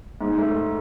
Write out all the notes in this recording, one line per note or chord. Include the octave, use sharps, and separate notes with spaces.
G#2
A3